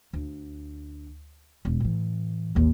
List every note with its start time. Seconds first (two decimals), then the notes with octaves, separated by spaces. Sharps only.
0.13 D2
1.65 E1
1.80 A2 E3
2.55 A1 D#2